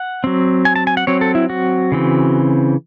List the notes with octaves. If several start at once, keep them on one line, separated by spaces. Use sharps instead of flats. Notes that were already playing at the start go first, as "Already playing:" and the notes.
Already playing: F#5
F#3 C4
G#5
A5
G#5
F#5
F#3 C4 C#5
A4
E4
F#4
C#3 E3 C4